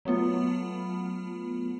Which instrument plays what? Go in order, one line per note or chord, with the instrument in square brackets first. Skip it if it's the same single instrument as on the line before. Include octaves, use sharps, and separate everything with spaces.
[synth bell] F#3 A3 B3 F4